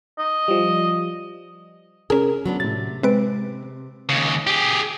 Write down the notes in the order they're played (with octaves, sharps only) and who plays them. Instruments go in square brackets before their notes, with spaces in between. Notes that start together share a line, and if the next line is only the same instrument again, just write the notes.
[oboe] D#5
[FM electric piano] F3 G3
[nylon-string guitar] C3 A#4 [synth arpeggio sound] C#4 G#4
[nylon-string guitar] F#3 B3 D4
[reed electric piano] A2 A6 [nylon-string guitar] C3
[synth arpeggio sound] G#3 B4 D7 [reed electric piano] C4
[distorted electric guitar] D#2 C#3
G4 G#4